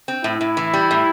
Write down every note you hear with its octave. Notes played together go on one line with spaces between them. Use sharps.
C4
A2 E4
A2
E3
G3
A2